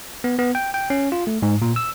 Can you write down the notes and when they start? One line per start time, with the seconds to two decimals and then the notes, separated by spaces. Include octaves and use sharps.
0.24 B3
0.39 B3
0.55 G5
0.74 G5
0.90 C#4
1.12 F4
1.27 A3
1.42 G#2
1.62 A#2
1.76 E6